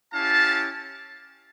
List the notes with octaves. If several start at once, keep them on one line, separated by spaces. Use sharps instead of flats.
C#4 E4 G4 F5 A5